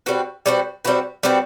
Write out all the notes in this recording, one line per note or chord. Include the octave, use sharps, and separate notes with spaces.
G3 C4 F#4 B4
G3 C4 F#4 B4
G3 C4 F#4 B4
G3 C4 F#4 B4